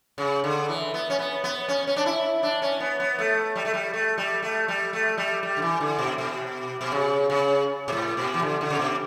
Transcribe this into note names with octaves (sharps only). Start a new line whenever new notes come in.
C#3
D3
E3
B3
C#4
B3
B3
C#4
C#4
D4
E4
D4
C#4
B3
B3
A3
G3
A3
G3
A3
G3
A3
G3
A3
G3
G3
D3
E3
D3
B2
B2
B2
C#3
C#3
B2
A2
B2
E3
D3
D3
C#3
B2